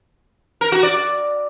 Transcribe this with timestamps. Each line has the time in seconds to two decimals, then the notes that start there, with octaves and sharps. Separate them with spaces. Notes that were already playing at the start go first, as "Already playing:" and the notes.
0.61 A#4
0.72 F#4
0.83 D5